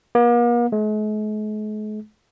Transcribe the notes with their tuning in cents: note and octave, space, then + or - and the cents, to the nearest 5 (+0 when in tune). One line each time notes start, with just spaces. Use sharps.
A#3 +45
G#3 +45